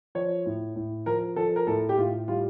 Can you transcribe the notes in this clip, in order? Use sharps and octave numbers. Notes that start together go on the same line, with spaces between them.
F3 C#5
A2
A2
F3 A#4
F3 A4
A#4
A2 A4
G4
A2 F4
G3 F4